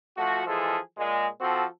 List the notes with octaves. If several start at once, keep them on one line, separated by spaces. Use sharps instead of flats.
F3 A3 F#4
E3 F3 G#3 G#4 A4
A#2 G#3
F3 C4 F#4 A4